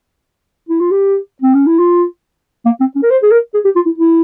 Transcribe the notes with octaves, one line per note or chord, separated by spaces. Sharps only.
E4
F4
G4
C4
C#4
E4
F4
A#3
C4
C#4
A#4
C5
G#4
A#4
G#4
G4
F4
E4
E4